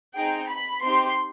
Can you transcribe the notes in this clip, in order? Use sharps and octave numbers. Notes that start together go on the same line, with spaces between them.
C4 D#4 G#4 G5
B5
C4 D#4 G4 C6